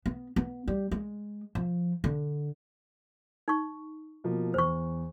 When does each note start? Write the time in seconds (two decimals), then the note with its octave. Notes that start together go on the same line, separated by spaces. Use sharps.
0.06 B3
0.36 B3
0.68 G3
0.91 G#3
1.55 F3
2.04 D3
3.48 D#4 C#6
4.24 B2 F3 A#3
4.54 E2 C5 C#6